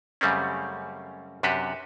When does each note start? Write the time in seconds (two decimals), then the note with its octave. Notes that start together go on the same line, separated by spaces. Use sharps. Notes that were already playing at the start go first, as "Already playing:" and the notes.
0.21 F#2 C#3 G3 A3 C4 C#4
1.43 F#2 C3 D4 F#4 G4 B4